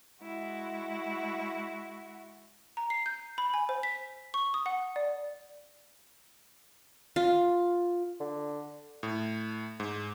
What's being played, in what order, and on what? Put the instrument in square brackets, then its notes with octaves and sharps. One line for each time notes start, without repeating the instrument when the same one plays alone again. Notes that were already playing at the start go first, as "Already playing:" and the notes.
[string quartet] G#3 E4 F#4
[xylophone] A#5
C7
G6
B5
G#5
C5
B6
C#6
D#6
F#5
D5
[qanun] F4
[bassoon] D3
[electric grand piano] A2
G#2